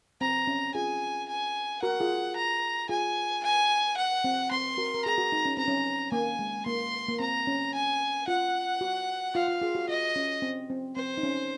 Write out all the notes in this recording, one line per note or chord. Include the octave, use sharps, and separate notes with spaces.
C4 A#5
C#4
F4 G#4 G#5
G#5
F#4 A#4 F#5
F4 G#4
A#5
F4 G#4 G#5
G#5
F#5
C4
C4 C6
F#4 A#4
A#4
G#4 A#5
F#4
D#4
C#4
C4 A#5
C#4
A#3 G#5
G#3
A#3 C6
A#3
C4 A#5
C#4
G#5
F4 F#5
F#4
F4 F5
F4
F4 G#4
F#4
F4 D#5
C#4
C4
C4
C4 C5
D#4
C#4